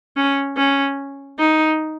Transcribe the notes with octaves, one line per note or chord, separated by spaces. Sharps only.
C#4
C#4
D#4